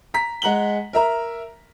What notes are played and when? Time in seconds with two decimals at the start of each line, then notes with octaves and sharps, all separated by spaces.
0.14 A#5 B6
0.42 G#3 F#5 A#5 F#7 G7
0.93 A#4 E5 A#5